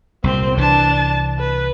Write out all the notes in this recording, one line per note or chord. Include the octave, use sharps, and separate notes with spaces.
C2 A#2 C4 C5
C2 E3 D4 A5
B4